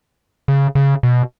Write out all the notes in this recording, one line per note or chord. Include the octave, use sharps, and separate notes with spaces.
C#3
C#3
B2